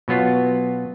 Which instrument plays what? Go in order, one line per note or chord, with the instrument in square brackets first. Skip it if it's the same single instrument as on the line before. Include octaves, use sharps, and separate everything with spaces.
[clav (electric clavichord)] B2 F#3 B3 F4